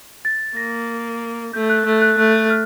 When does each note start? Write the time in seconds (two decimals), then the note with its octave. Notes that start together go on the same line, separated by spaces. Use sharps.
0.25 A6
0.57 A#3 A#6
1.53 A3 G6
1.69 F#6
1.86 A3
2.02 F#6
2.18 A3 F#6
2.50 F6